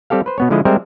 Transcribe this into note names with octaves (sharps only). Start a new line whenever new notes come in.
G3 C4 G4 A4 F5
B4 C5
B2 B3 C#5
D3 F3 G#3 E4 D#5
G3 G#3 C4 A#4 C5 E5